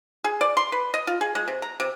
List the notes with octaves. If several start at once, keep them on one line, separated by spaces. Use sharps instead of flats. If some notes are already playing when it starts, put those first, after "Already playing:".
G#4
D5
C6
B4
D#5
F4
G#4
G#3
C3
A#5
C3